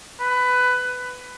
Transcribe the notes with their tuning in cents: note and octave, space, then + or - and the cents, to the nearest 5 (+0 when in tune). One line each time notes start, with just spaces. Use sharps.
B4 +15